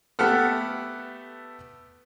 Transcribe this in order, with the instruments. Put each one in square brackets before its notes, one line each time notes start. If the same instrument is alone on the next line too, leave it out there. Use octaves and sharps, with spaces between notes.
[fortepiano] A3 B3 G4 A4 F#5 F6